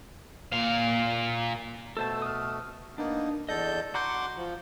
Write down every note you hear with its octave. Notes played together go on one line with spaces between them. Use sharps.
A#2 F5
B2 A3 A4 C5 A5
D#6 F6
A#3 B3 D4 D#4
E2 A4 D5 D#5 G6
F#4 F#5 A#5 C6 D6 G6
F3